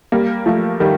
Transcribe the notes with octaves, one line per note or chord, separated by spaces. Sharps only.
G3 A#3
F3 A3
D#3 G3